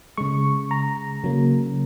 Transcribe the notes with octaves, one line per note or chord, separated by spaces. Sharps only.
C#3 G#3 C#6
A#5
C#3 F#3 A#3